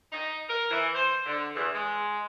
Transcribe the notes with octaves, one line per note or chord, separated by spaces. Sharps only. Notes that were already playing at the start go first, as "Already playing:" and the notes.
D#4
A#4
E3
C5
D3
E2
G#3